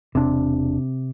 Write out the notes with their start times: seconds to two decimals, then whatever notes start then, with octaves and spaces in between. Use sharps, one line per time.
0.15 E1 C3 D4